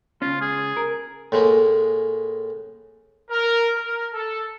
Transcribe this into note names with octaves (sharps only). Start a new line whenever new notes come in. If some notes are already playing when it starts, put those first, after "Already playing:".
C#2 C#4 F4
G#4
A#4
A2 G#3 A#3
A#4
A#4
A4